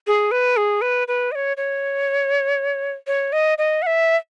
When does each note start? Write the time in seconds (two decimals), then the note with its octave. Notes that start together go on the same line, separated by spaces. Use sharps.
0.07 G#4
0.31 B4
0.57 G#4
0.81 B4
1.08 B4
1.32 D#5
1.35 C#5
1.57 C#5
3.07 C#5
3.33 D#5
3.58 D#5
3.82 F#5
3.87 E5